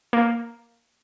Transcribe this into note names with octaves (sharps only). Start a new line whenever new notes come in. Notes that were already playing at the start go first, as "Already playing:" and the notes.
A#3